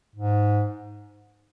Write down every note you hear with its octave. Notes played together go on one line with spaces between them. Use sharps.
G#2